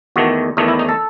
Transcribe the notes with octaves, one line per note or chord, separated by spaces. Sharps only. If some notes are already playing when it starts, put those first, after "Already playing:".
E2 D#3 A3 F#4
E2 D#3 A3 D#4
E4
D#4
A4